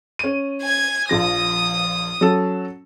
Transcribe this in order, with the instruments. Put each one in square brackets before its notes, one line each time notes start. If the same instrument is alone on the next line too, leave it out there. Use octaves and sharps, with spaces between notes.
[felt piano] C#4 D#7
[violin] G#5 G#6
[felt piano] A#1 F3 A#6 [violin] D#6
[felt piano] F#3 C#4 A4